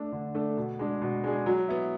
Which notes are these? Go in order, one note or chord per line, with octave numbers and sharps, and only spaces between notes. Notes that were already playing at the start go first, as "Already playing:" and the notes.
Already playing: A3 D4 A4
D3
A3 D4 A4
B2
G#3 D4 G#4
B2
G#3 D4 G#4
F#3
B3 E4